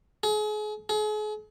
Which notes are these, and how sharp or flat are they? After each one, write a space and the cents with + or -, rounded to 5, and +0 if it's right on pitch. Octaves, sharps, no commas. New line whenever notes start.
G#4 +35
G#4 +40